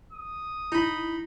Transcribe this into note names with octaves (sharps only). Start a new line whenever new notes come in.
D#6
D#4 E4 B5